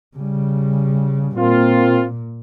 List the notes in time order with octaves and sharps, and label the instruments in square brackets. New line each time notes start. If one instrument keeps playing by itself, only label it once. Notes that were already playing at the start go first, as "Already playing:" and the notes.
[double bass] C#3 G3
[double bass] A#2 [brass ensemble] A#3 C4 F4